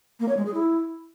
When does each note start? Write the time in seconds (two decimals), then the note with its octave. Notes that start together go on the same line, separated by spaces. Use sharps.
0.20 A#3
0.28 C#5
0.37 G#3
0.45 G#4
0.54 E4